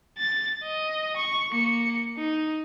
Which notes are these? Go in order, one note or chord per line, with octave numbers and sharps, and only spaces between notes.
A6
D#5
C#6
A#3 C#7
D#4